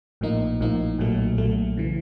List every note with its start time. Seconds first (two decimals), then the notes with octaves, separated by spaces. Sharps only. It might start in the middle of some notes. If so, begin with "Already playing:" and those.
0.21 A#1 A2 F3 A#3 D#4
0.60 A#1 A2 F3 A#3 D#4
0.98 B1 A#2 F#3 A3
1.37 B1 A#2 F#3 A3
1.77 C#3 E3